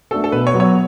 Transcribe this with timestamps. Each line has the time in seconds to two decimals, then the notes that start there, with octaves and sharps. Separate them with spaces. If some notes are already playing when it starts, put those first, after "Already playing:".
0.11 A3 D4 F#4 A4
0.24 A4
0.32 B2 B4
0.47 C#5
0.54 F#3 B3 F#4
0.60 C#5